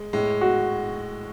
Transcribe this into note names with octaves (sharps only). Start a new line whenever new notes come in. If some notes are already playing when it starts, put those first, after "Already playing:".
Already playing: G#3
A2 G#3
F#4